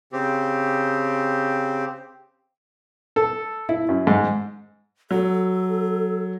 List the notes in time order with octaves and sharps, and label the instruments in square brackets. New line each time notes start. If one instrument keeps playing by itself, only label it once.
[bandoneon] C#3 C4 G4
[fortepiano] A4
E4
F#2
G#2
[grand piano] F#3 [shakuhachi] A4